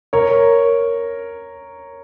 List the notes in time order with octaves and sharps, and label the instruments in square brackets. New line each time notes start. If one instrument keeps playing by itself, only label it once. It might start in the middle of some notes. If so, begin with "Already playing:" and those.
[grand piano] A#4 C#5